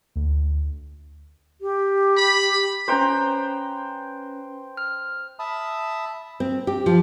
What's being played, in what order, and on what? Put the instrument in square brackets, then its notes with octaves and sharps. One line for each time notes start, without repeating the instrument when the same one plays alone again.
[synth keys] D2
[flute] G4
[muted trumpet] B5
[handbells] C#4 B4 [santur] C5 G5 A#5
[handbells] F6
[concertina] E5 A5 B5 D#6
[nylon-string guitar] C4
G4
F3